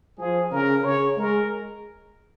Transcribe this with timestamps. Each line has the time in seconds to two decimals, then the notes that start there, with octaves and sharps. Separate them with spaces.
0.18 F3 G#4
0.51 C#3 A#4
0.84 C#3 C#5
1.18 G#3 A#4